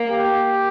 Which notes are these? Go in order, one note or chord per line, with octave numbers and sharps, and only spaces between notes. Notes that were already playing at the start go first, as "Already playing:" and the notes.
Already playing: A#3
G4